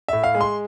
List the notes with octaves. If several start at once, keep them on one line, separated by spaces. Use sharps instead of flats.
A2 E5
F5
G#3
C6